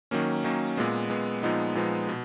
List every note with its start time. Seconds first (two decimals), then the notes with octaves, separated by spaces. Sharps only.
0.11 D#3 F#3 A#3 C#4
0.44 D#3 F#3 A#3 C#4
0.77 A#2 G#3 B3
1.09 A#2 G#3 B3
1.43 A#2 F3 G#3 B3 D#4
1.75 A#2 F3 G#3 B3 D#4
2.09 B2